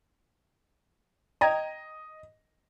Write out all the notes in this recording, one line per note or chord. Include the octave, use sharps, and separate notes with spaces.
D#5 G5 A#5 G#6